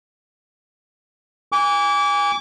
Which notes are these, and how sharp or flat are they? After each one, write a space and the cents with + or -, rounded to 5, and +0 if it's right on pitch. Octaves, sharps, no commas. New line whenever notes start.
G#5 -25 D6 -30